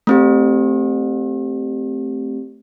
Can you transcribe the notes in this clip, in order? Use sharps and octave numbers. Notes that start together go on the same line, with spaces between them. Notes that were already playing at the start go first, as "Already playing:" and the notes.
A3 C4 G4